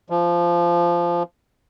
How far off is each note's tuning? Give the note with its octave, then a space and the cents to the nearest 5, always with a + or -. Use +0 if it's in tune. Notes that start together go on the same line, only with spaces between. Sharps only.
F3 -15